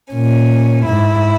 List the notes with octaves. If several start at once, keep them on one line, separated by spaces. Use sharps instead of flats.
A#2 C#4
G#2 E4